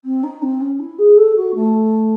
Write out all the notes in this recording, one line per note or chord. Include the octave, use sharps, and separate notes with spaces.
C4
D#4
C4
C#4
E4
G#4
A4
F#4
A3